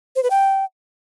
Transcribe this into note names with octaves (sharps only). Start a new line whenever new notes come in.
C5
B4
G5